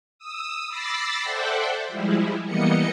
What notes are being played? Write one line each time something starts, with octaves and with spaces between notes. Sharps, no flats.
D#6 E6
B5 D6 E6 A6 A#6 C7
A4 C5 D5 E5 F#5 G5
F3 G3 G#3 E4
E3 G3 A#3 B3 D#5 C#7